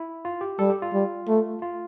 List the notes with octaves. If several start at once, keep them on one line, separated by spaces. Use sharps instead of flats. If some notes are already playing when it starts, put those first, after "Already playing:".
Already playing: E4
F4
G4
G3 A4
G4
F4
G3
A3
F4